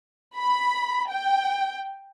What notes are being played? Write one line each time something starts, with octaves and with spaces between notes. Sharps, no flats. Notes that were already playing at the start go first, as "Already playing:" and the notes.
B5
G5